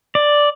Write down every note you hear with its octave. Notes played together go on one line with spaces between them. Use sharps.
D5